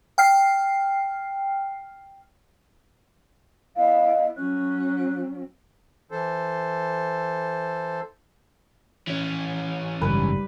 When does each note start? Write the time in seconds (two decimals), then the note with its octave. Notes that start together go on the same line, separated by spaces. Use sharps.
0.18 G5 F6 C7
3.77 B3 E4 D#5 F5
4.38 F#3 C#4 F#6
6.11 E3 A4 C5
9.07 E3 C#4
10.02 F#1 G#2 G3 B4